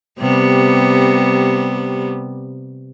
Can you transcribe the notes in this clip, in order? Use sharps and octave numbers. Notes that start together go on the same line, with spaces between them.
C3 G3 B3